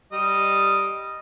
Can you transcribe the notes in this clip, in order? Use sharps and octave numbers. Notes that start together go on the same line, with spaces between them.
G3 D#5